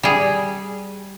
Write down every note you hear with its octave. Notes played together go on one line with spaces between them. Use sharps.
G3 G#4